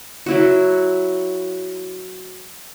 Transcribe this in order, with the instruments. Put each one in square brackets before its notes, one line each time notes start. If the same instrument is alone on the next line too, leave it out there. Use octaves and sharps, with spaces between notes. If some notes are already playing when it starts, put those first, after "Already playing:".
[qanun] F#3 E4 F#4